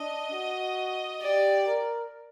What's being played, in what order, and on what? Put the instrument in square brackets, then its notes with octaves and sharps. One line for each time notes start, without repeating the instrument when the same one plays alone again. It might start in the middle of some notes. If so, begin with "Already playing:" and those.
Already playing: [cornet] D4 [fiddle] D#5
[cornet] F#4
[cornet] G4 [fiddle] D5
[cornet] A#4